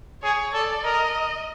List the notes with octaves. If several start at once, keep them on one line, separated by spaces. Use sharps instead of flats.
G#4 C#5
A4 D5
A#4 D#5